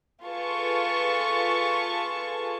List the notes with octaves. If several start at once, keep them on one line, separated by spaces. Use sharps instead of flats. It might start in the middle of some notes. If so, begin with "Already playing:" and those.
F4 G#4 A4 B4 A5 C#6